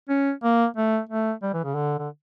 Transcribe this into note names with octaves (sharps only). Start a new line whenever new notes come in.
C#4
A#3
A3
A3
G3
E3
C#3
D3
D3